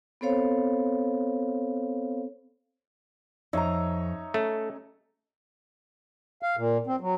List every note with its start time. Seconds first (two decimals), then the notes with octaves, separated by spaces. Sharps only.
0.21 B3 C4 A4 C5 C#5 F5
3.53 F2 D#4 C#5 E5 A#5
4.34 A3 C#4
6.43 F5
6.57 A#2
6.87 C4
7.01 F#3